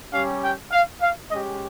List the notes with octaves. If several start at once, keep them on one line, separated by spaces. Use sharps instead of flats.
G3 C#4 G4 F5
G5
F5
F5
G#3 C#4 G4 D#5